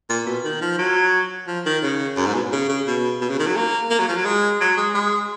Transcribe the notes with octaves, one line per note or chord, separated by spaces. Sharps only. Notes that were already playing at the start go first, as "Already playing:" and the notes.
A#2
B2
D#3
F3
F#3
F3
D#3
C#3
F#2
G#2
B2
C#3
C#3
B2
B2
C#3
D#3
F#3
A#3
A#3
F#3
F3
F#3
G#3
F#3
G#3
G#3